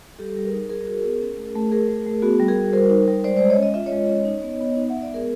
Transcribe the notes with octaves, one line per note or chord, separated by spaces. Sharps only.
G3 G4 A4
G3
G#4 A#4
D#4
G3 G#4 A#4
F#4
B3
C#4
A3
A3
A3 G#4 A#4
A3
A3
B3 F#4 G#4
G3
G#4 A#4
F#4
G3 A#4 C5
D#4
G3
G#3 C5 D5
G#3 C5 D5
C#5 D#5
C#4
D#5
F4 E5
C#5 D#5
G#3
C#4
D#4
B3
B3
D#4
B3 E5 F#5
D5 E5
G#3 G#4 A#4